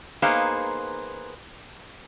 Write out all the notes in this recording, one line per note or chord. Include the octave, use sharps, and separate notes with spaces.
A#3 B3 D#4 G#4 C5 F5